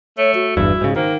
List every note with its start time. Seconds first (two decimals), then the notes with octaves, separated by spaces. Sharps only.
0.18 A3 C#5
0.35 F#4
0.57 G1 E2 G2 E4
0.81 G#2 C#3
0.96 D#3 A#3 C5